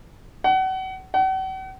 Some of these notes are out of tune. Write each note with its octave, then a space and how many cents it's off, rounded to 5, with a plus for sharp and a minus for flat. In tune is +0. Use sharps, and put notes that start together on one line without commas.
F#5 +35
F#5 +45